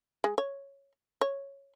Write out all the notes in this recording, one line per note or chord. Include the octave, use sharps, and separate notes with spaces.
G#3
C#5
C#5